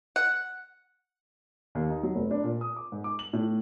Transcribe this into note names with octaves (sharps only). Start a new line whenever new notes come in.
F#5
D#2
D#4
F#3
F1
D4
A#2
D#6
D6
G#2
D6
F#7
A2